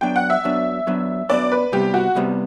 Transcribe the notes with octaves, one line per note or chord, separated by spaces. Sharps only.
F#2 F#3 B3 D4 G5
F#5
E5
F#2 F#3 B3 D4
F#2 F#3 B3 D4
F#2 F#3 B3 D4 D5
B4
C2 C3 G3 B3 G4
F#4
C2 C3 G3 B3